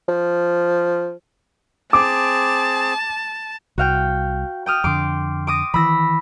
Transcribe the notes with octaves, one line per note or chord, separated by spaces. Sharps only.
F3
C4 G#4 A5 D6
C2 F#4 F5 G5
G5 D#6 F6
F2 D3 C6 D6
D6 D#6 A#6
D#3 E3 B5 E6 A#6